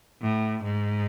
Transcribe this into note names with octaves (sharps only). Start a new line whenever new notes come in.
A2
G#2